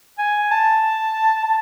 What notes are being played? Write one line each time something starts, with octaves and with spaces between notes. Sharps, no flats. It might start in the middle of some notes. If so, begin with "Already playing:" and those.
G#5
A5
A5